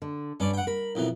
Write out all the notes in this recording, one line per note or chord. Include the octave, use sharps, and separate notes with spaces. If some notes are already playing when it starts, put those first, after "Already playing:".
D3
G2 C#4 D5
F#5 G5
A#4 B5
B1 F2 E3